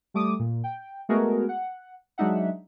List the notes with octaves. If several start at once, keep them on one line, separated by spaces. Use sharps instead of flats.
G3 A3 D6 D#6
A#2
G5
G#3 A3 B3 F#4 G#4 A#4
F#5
F#3 G#3 D4 D#4 E5 F#5